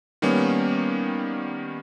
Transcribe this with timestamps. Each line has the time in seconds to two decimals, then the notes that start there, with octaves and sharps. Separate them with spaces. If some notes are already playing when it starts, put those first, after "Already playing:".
0.22 D#3 G3 A#3 B3 C#4